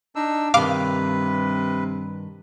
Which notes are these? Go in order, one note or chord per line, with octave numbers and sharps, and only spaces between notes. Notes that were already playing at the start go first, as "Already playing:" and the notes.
D4 D#4 E6
G2 C3 D#3 B4 F5 D6